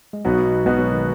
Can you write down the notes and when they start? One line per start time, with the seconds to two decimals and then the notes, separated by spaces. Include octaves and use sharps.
0.13 G#3
0.25 B1 B2 F#3 B3 D#4 F#4
0.65 B1 B2 G#3 B3 D#4 F#4
0.78 F#3
0.92 D#3